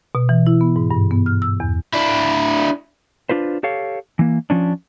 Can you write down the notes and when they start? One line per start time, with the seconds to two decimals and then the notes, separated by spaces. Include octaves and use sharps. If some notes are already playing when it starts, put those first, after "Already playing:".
0.15 B2
0.29 E3
0.47 E4
0.61 B3
0.76 G#2
0.91 G2
1.11 B3
1.26 F6
1.42 E6
1.60 E2
1.93 D4 E4
3.29 D4 F4 B4 C5
3.63 G4 A4 C#5 F5
4.19 E3 A#3
4.50 F3 C#4 D4